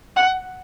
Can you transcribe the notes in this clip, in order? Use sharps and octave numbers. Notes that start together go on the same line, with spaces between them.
F#5